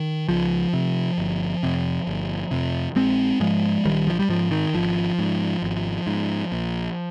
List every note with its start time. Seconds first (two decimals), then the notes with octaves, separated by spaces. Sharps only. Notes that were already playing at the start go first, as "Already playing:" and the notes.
Already playing: D#3
0.29 C#2 F3
0.73 C3
1.18 G1
1.63 F2 C3
2.07 G1
2.51 F2 C3
2.95 A#1 G#3 C4
3.40 G#2 F3 G#3
3.85 A#1 D#3 G3
4.07 F3
4.19 G3
4.29 G#2 F3
4.51 D#3
4.74 G#1 F3
5.19 G#2
5.62 G#1
6.07 G#2
6.52 A#1